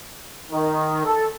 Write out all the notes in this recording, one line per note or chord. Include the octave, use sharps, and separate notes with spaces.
D#3
A4